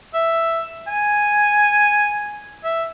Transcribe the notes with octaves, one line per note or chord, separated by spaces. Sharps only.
E5
G#5
E5